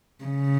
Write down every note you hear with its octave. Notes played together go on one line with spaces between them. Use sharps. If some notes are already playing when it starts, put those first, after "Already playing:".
C#3